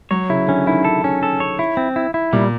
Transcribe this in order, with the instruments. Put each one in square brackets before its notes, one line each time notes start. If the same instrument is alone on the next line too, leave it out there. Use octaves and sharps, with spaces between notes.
[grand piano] F#3 [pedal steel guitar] C#5
[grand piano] C#3 [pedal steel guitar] E4
[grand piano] D3 [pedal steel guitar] C#4
[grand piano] D#3 [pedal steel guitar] E4
[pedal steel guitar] A4
C#4
A4
C#5
E4
C4
E4
E4
[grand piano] A#2 [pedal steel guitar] G3